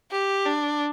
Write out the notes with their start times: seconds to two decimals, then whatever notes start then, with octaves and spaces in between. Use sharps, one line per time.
0.12 G4
0.46 D4